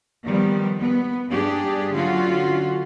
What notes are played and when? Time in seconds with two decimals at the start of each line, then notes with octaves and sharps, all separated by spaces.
0.25 D#3 F3 G3 B3
0.80 B3
1.28 G2 D4 G4 G#4
1.93 D3 F#3 C#4 F4 F#4